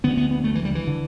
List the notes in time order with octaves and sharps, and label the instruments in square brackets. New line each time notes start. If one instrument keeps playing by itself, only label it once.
[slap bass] D2 D3 B3
B3
B3
A3
E3
G3
E3
D3